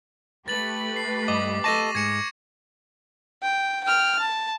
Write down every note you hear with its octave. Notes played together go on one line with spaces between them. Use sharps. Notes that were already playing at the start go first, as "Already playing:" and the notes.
A3 G4 B4 A6 F#7
C7
G2 D#5 D6
A4 D#5 A5 C#6 A#6 D#7
G#2 G#3 G#6 C#7 E7
G5
G5 F6
A5